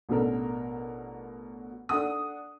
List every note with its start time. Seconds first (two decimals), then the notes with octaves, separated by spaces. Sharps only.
0.09 A1 B2 D4 A4 A#4
1.89 D4 A4 F#5 D#6